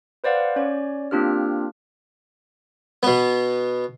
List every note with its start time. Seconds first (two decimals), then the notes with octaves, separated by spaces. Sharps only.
0.24 B4 C5 D5 F5 F#5
0.56 C#4 C#5 D5
1.11 A#3 C4 D4 F4 G4 F6
3.03 B2 B3